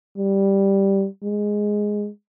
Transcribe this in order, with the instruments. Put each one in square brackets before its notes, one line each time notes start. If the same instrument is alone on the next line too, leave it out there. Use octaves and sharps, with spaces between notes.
[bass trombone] G3
G#3